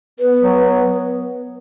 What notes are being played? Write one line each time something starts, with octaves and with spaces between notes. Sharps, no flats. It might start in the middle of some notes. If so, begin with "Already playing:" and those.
B3 B4
F#3
B3